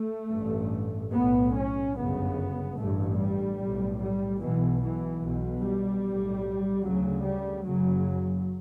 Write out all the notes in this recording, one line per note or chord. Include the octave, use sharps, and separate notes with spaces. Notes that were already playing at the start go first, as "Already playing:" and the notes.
Already playing: A3
A1 G2
B1 A2 B3
C#4
G1 F#2 C#3 B3
A1 G2 A3
G3
B1 A2
G3
B1 B2 E3
E3
B1 B2
G3
B1 A2
D2 C#3 F#3
G3
F#1 F#2 C#3 F#3